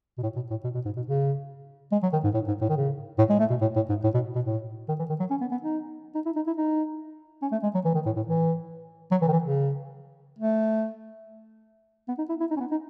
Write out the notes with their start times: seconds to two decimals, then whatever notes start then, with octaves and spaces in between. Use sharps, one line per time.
0.18 B2
0.23 A2
0.36 B2
0.50 A2
0.64 B2
0.75 B2
0.85 G#2
0.97 B2
1.07 C#3
1.92 G#3
2.03 F#3
2.13 D#3
2.24 G#2
2.34 A2
2.48 G#2
2.62 A2
2.70 D#3
2.77 C#3
3.19 A2
3.30 G#3
3.40 A3
3.50 B2
3.61 A2
3.76 A2
3.89 G#2
4.04 A2
4.14 B2
4.35 B2
4.45 A2
4.89 D#3
4.99 E3
5.09 D#3
5.20 F#3
5.31 C#4
5.41 B3
5.52 B3
5.62 D#4
6.15 D#4
6.26 E4
6.36 D#4
6.47 E4
6.58 D#4
7.42 C#4
7.52 A3
7.63 G#3
7.75 F#3
7.85 E3
7.95 D#3
8.06 A2
8.16 A2
8.27 E3
9.12 F#3
9.22 E3
9.28 D#3
9.33 E3
9.44 C#3
10.39 A3
12.08 B3
12.18 D#4
12.29 E4
12.40 E4
12.51 D#4
12.57 C#4
12.60 B3
12.71 D#4